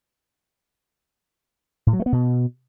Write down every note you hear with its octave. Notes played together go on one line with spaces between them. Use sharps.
A2
F#3
A3
B3
B2